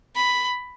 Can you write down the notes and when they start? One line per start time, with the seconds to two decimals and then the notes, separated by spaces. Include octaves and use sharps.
0.16 B5